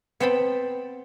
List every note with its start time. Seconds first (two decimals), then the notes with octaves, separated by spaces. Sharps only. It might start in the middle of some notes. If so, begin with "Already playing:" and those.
0.20 B3 C4 G5 A5 B5